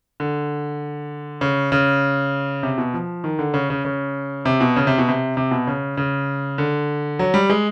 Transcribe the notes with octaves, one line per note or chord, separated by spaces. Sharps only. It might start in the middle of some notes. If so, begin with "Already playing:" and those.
D3
C#3
C#3
C3
B2
F3
D#3
D3
C#3
C#3
C#3
C3
B2
C#3
C3
B2
C3
C3
B2
C#3
C#3
D3
F#3
G3
G#3